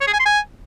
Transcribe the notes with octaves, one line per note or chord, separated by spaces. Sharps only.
C#5
G#4
G#5
C6
G#5